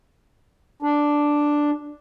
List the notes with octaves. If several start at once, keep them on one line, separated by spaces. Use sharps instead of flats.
D4